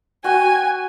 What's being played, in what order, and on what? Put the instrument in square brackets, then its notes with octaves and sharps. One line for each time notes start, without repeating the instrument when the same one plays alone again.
[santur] F#4 G5 [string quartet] G#5